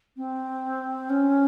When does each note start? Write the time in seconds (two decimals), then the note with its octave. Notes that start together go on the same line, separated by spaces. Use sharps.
0.17 C4
1.10 C#4